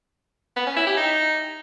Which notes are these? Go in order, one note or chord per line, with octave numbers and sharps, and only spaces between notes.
B3
C#4
E4
G4
D#4